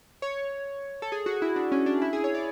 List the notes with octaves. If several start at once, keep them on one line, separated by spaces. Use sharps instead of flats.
C#5
A4
G#4
F#4
E4
D4
C#4
D4
E4
G#4
C#5
D5